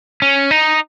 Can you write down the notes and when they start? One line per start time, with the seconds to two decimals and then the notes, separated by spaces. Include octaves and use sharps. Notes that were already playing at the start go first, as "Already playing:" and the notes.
0.22 C#4
0.51 D#4